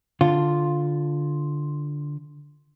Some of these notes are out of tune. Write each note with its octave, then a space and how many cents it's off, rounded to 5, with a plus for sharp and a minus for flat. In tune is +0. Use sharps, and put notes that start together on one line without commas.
D3 +0 F4 +0